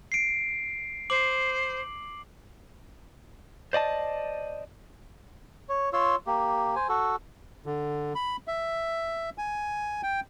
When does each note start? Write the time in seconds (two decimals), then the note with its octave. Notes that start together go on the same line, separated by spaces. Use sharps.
0.12 C7 D7
1.10 C5 D6 F#7
3.73 C5 D5 D#5 A5
5.69 C#5
5.93 F4 C#5 C6 E6
6.27 A#3 G4
6.76 C5 G#5
6.89 F#4 A4
7.66 D3
8.15 B5
8.48 E5
9.38 G#5
10.03 G5